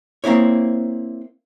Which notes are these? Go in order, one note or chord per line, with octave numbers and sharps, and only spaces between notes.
A#3 C4 E4 C#5